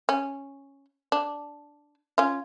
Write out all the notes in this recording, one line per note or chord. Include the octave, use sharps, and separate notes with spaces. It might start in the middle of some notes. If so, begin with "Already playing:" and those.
C#4
D4
C#4 F4